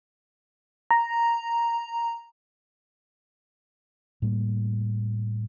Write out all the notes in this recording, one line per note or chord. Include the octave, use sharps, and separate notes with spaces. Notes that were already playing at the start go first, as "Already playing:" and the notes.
A#5
A2 G3 A#3